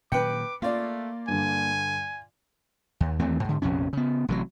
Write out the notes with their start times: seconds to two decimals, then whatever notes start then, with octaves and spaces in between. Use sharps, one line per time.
0.12 A#2 D#3 F#3 B4 G5 D6 C#7
0.62 A3 A#3 F4 D5
1.28 G2 D3 G#5
3.00 D#2
3.19 D#2 E3 A3 C4
3.44 G#2 D3
3.62 A#1 F2 C3 C#4
3.93 C#3 B3
4.28 A1 C3 E3 F#3